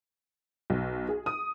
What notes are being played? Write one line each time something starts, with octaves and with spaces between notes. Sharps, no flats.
B1
G#4
D#6